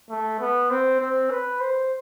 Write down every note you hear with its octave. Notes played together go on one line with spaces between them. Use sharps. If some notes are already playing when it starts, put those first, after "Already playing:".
A3
B3
C4
C4
B4
C5